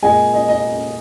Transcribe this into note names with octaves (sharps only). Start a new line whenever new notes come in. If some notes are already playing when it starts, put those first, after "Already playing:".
A#2 G#3 D#5 G#5
D#5
D#5